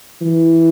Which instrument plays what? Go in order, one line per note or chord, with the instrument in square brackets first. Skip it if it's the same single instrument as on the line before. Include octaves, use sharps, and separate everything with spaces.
[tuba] E3